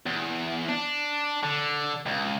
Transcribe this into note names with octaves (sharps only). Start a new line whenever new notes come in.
E2
D4
D3
C#2